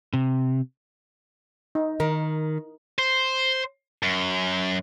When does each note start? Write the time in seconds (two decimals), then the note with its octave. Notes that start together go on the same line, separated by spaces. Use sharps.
0.13 C3
1.75 D#4
2.00 D#3 A#4
2.99 C5
4.03 F#2